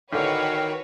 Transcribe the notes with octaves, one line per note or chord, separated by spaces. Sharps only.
A1 D3 D#3 F#4 B4 C#5 F5 G5